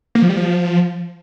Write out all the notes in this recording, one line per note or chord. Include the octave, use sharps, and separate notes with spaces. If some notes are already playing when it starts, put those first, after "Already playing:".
A#3
F3
G3
F3